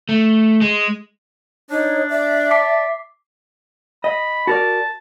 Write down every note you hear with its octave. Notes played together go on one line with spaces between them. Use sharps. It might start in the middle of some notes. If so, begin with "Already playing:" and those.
A3
G#3
D4 D#4 C#5
D5 E5
A5 D6 B6 C7
D#5 B5
F#4 A#4 D5 A5